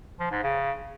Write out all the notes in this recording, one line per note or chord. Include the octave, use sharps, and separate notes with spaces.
F3
G#2
C#3